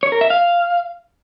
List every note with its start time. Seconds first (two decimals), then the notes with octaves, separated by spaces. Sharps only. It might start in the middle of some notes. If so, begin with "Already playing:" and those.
0.03 C#5
0.12 A#4
0.21 E5
0.30 F5